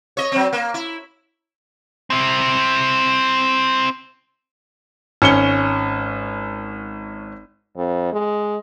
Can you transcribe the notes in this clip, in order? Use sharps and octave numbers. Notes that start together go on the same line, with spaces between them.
C#5 D#5
F#3 C4
A#3
E4
C4 E4
G#1 C#4 C#7 G7
F2
G#3